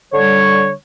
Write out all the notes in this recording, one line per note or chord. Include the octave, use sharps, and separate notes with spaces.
D3 G3 C#5